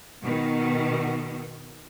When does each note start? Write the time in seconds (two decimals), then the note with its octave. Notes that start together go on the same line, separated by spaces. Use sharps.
0.22 B2 D#3